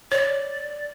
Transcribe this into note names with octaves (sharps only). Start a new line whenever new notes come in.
C#5 D5